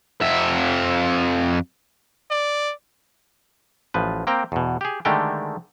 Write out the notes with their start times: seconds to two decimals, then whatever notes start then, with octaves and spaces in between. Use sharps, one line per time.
0.21 F2 E5
2.31 D5
3.94 A1 F3 B4
4.27 A#3 C4 G5 A#5
4.52 E2 B2
4.81 G4 G#4
5.05 D3 D#3 G#3 A3 G4 G5